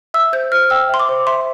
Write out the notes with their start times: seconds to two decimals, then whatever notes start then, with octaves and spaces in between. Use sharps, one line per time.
0.14 E5 E6
0.33 C5 G6
0.52 C5 F6
0.70 G5 E6
0.89 E5 C6
1.00 D6
1.09 C5
1.27 E5 C6